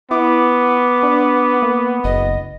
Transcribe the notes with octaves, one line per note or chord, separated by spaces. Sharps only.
B3 E4 D6
D4
A#3
F#1 D#5